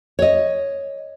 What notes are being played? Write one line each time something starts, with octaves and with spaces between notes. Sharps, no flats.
C#5 D#5